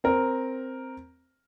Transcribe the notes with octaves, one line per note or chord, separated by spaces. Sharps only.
C4 A#4